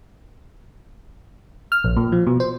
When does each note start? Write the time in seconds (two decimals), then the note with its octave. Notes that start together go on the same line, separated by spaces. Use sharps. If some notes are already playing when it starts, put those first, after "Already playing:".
1.72 F6
1.84 A#1
1.97 A#2
2.12 F3
2.27 B2
2.40 C5